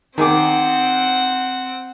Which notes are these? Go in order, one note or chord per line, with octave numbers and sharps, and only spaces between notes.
D#3 C4 G#4 F#5 D6